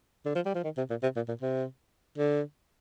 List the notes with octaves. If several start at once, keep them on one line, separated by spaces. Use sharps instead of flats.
D3
F3
G3
F3
D#3
C3
A#2
C3
A#2
A#2
C3
D3